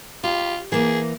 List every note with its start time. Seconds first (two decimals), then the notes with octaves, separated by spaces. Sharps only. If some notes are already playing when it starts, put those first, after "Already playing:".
0.24 F4 G4
0.72 E3 A#3 G#4